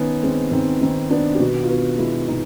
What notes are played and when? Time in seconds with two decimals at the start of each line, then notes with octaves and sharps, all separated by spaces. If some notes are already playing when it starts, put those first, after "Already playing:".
Already playing: D#3 B3 C#4
0.23 G#3 C4
0.52 D#3 C4
0.81 D#3 C4
1.10 B3 D4
1.35 G4
1.40 B2 F#4
1.64 F4
1.69 B3 F#4
1.98 G#3 E4
2.28 B2 D#4